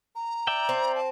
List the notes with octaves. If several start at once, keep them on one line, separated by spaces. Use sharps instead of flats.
A#5
D5 E5 G5
C4
A5